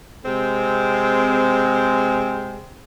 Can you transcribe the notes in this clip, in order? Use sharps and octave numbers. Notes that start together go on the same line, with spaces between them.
C3 G#3 C4